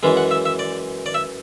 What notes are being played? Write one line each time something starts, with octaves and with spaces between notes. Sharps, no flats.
F#2 E3 G#3
F#5
E5
E5
D5
D5
E5